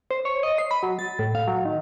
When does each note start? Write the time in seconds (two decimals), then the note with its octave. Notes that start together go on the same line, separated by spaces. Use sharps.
0.11 C5
0.25 C#5
0.43 D#5
0.58 C7
0.71 B5
0.83 F#3
0.99 A6
1.19 A2
1.35 F5
1.48 F#3
1.65 D#3